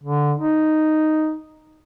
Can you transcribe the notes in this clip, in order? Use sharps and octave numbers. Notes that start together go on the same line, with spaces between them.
D3
D#4